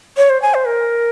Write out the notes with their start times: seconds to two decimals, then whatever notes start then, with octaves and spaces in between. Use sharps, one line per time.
0.17 C#5
0.30 C5
0.42 G#5
0.54 C5
0.65 A#4